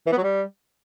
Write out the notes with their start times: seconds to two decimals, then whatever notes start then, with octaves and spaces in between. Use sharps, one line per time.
0.07 E3
0.12 B3
0.18 F#3
0.23 G3